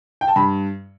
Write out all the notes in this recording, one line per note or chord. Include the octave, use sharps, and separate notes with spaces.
G5
A5
G2 B5